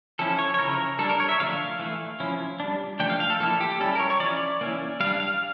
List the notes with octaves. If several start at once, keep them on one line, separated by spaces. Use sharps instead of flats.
F3 C#4 E4 A4
C#5
C#5
C#3 F3 C#4 E4 A#4
G3 D4 A4
A#4
C#5
E5
D3 F3 A3 D4 F5
E3 A3 E4
F3 C#4 E4
G3 D4
F3 A3 D4 G5
F5
F5
A4
F3 A#3 E4 A4
G4
G3 C#4 E4 A4
A#4
C#5
C#5
F3 C#4 E4 D5
E3 A#3 C#4 E4
G3 D4 F5
F5